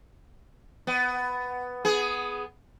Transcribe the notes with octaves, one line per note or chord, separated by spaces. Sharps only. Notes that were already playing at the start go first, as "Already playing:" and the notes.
B3
B3 G#4